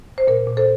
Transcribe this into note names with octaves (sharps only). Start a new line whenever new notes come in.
C5
A#2 A#4
A#2
A4 C5